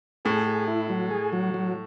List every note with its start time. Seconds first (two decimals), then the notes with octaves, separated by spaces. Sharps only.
0.25 A2 G#4
0.47 G#4
0.68 E4
0.89 F#3
1.10 G#4
1.33 F#3
1.54 F#3